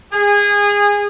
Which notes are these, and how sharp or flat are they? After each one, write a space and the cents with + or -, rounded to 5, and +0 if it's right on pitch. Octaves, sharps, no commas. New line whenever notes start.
G#4 -25